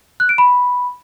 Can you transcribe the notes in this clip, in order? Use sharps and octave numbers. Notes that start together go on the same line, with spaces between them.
F#6
D7
B5